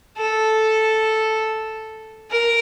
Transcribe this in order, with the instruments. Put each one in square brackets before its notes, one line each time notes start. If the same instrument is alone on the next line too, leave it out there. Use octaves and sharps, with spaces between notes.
[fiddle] A4
A#4